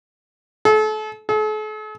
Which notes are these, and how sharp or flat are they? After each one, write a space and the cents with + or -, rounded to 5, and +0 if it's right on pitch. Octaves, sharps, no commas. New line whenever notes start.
A4 -35
A4 -45